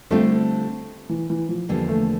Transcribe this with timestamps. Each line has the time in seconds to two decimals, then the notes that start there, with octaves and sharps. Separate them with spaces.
0.10 D3 G3 A3 C4 F4
1.09 E3
1.30 E3
1.49 F3
1.69 E2 D3 F3 G3 A#3
1.89 A3